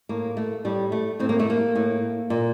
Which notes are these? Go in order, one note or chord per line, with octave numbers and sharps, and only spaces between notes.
A2 A#3
A3
A2 G3
A3
A2 C4
A#3
A3
A#3
A2
A#2